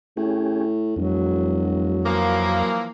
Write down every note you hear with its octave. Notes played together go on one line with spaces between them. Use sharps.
A2 C#4 G4 G#4
E1 F2 F#3
E3 F3 A#3